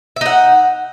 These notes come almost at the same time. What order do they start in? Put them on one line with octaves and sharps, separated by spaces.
E5 D#4 F#5